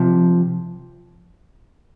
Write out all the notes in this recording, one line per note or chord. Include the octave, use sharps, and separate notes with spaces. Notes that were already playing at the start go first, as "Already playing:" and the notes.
Already playing: C3 F3